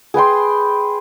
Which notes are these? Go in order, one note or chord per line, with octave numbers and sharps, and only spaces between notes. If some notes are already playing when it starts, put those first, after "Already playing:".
G#4 B4 G5 C6